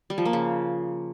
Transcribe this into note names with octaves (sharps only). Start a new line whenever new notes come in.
G3
F3
A#3
C#3